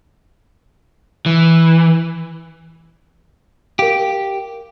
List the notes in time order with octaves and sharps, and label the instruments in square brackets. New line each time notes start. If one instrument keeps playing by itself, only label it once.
[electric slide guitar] E3
[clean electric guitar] G4 [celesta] A#4 F5